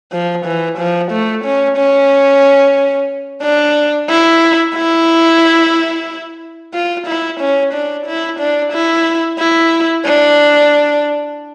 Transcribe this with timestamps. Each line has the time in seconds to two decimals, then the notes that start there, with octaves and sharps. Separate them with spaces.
0.12 F3
0.45 E3
0.78 F3
1.12 A3
1.45 C#4
1.78 C#4
3.43 D4
4.09 E4
4.76 E4
6.74 F4
7.07 E4
7.40 C#4
7.73 D4
8.07 E4
8.40 D4
8.73 E4
9.39 E4
10.05 D4